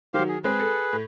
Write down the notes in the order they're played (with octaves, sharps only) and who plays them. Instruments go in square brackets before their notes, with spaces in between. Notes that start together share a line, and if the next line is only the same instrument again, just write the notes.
[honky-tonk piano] D#3 F#3 [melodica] G4 C5 F5
[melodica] G#4
[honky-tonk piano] G#3 C4 [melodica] G#4 B4
[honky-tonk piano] A4
A2